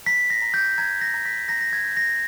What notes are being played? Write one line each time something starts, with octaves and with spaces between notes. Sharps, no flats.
A#5 B6
A#6
A#5
G6
A#5 G#6
A#6
A#5
B6
A#5 A#6
A#6
G#6
G6
A#6